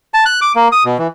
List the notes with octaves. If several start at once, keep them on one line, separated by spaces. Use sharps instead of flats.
A5
F#6
D6
A#3
D#6
B2
E3